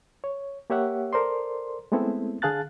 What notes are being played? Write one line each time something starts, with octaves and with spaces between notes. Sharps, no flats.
C#5
A#3 G4 C#5 E5 F#5
A4 A#4 C5 D5 C6
G#3 A3 B3 C4 E4 A4
D3 G#4 F5 A5 F#6 A6